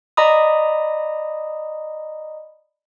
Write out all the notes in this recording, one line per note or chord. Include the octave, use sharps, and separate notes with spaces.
D5 D#5 A#5 B5 D#6